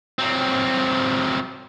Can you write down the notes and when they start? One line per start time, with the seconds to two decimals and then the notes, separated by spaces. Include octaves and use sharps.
0.19 F#3 C4